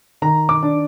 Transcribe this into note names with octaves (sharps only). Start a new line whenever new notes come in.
D#3 A#5
D6
D4